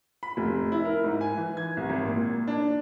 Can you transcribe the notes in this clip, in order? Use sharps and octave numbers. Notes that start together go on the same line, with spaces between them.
B5
F1
E4
A#4
G#2
G#5
E3
G#6
C2
G#1
A#2
D4